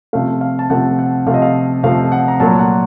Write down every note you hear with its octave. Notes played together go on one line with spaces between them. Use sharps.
C3 F3 A3 F5
F5
A5
C3 F3 A3 F#5
F#5
C3 F3 A3 F5
D#5
F5
C3 F3 A3 F5
F#5
A#5
A#2 F#3 A3 A5
F#5